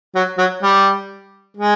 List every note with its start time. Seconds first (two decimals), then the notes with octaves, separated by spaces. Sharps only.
0.15 F#3
0.38 F#3
0.63 G3
1.57 G#3